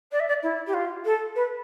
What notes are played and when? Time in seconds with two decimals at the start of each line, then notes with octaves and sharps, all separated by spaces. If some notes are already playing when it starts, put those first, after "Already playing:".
0.11 D5
0.19 E5
0.28 D5
0.42 E4
0.66 G4
0.73 F4
1.05 A4
1.35 B4